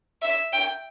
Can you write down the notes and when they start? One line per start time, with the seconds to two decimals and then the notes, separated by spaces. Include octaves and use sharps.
0.22 E5
0.53 G5